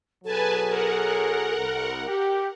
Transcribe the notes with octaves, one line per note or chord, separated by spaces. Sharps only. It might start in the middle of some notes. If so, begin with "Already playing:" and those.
B1 F#3 G#4 A4 B4 G#5 A5
A#4 F#5
C2
G4